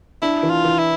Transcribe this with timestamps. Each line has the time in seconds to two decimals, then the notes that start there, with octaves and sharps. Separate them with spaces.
0.22 D4 E4
0.43 E3
0.50 F4
0.64 E3
0.78 E4